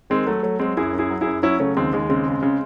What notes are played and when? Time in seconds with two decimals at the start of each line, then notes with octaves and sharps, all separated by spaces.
0.10 D#3 G#3 C4
0.27 F#3 A3
0.43 F#3 A3
0.59 F#3 G#3 C4
0.77 F#2 E4 G#4
0.93 F#2
0.99 E4 G#4
1.10 F#3
1.21 F#2 E4 G#4
1.43 F#3 C#4 E4
1.59 C#3 A3 C#4
1.77 D#2 G#3 C4
1.93 D#2 G#3
2.09 C#3 G#3 C4
2.27 C#3
2.42 C#3